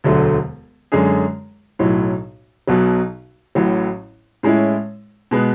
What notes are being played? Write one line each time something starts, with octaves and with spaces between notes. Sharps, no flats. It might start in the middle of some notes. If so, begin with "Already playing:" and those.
E1 D2 D3 F#3 A3
F#2 D3 G#3 C#4 G#4
B1 A2 F#3
B1 B2 F#3
A1 A2 F#3
A2 G#3 C#4 E4
B2 G#3 B3